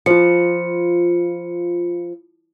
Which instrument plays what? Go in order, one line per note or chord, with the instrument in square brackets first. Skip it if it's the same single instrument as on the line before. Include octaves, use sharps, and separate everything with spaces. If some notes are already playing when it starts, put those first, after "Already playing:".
[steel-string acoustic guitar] F3 [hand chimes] F4 C#7